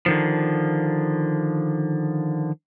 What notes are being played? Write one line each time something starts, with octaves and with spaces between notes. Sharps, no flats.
D3 D#3 F3